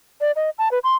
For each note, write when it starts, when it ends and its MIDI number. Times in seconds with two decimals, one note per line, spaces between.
0.21 0.32 74
0.36 0.50 75
0.58 0.69 81
0.71 0.79 71
0.84 0.95 84